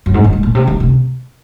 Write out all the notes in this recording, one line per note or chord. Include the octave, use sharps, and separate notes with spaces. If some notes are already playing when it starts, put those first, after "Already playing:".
F#2
G#2
F#2
G#2
A#2
C3
D#3
C3